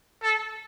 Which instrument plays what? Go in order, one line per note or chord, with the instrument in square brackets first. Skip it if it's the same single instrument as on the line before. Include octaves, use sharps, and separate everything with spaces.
[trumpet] A4